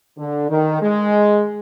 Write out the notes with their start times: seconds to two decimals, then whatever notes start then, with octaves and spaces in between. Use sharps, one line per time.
0.18 D3
0.49 D#3
0.81 G#3